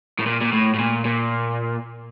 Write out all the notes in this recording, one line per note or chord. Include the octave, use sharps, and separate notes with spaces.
A2
A#2
A#2
A2
A2
A#2
A#2